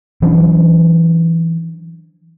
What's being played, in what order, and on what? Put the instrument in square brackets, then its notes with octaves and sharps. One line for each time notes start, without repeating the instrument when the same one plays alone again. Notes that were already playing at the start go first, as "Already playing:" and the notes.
[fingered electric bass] E3 F#3 C#4 D4